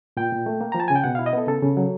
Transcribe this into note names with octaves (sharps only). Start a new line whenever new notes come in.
A#2 G5
A#2
A3
A#3
F3 A#5
A5
C#3 G#5
G5
B2 F#5
E4 F5
D#5
B3 A4
C#3 A4
C#3
F#3